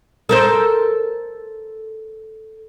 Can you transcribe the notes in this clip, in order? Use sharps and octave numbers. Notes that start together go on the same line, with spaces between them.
A4 A#4 C5